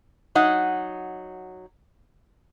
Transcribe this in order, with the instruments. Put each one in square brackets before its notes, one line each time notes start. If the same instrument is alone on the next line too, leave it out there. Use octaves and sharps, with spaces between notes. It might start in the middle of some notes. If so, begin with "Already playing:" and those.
[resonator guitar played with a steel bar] F#3 D#4 F#5